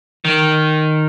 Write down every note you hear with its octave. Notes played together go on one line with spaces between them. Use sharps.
D#3